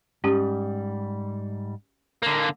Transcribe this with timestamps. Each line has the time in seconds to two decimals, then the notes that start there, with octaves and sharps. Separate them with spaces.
0.24 G#2 G3 C#4 G4
2.23 D3 A#3